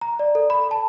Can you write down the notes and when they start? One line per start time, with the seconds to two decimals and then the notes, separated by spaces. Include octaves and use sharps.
0.01 A#5
0.19 D5
0.35 A4
0.50 B5
0.71 A5